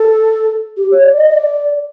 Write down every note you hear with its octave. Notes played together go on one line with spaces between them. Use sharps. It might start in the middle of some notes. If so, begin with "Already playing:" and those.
Already playing: A4
G4
C#5
D5
D#5
D#5
D5